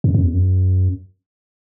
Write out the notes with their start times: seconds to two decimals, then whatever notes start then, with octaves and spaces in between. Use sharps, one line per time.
0.04 F#2
0.14 F#2
0.23 E2
0.34 F#2